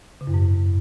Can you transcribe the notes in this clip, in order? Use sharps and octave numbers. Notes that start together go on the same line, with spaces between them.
C#3
F#2
G#2